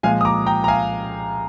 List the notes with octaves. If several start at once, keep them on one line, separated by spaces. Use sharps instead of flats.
A#2 F3 G#3 F5 G#5
D#6
A#5 D6
G5 A#5
A#5
F5 G#5